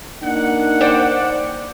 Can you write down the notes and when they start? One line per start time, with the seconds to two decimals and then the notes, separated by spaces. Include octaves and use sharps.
0.23 A#3 D4 D#4 F#5
0.80 C5 D5 G5